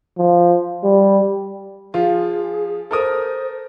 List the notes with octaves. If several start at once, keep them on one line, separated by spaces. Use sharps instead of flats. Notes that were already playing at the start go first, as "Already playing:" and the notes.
F3
G3
F3 F4 G#4
A4 A#4 C5 D#6